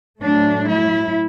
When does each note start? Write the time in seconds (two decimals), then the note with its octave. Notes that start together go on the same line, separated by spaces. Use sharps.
0.20 A2 F#3 A3 D4
0.69 E4